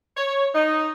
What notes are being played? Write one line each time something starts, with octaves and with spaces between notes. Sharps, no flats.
C#5
D#4